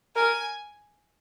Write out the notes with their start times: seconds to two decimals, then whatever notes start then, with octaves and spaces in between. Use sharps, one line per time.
0.16 A#4 G#5